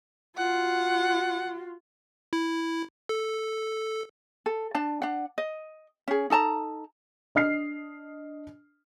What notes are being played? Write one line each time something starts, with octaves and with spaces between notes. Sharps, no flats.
F4 F#4 F#5
E4
A4
A4
D4 A5
D4 F#5
D#5
C#4 G#4
D#4 A4 A5 A#5
D4 D#5 F6 C7